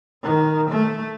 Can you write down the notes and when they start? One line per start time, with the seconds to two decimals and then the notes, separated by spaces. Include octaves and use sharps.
0.23 D#3
0.70 A3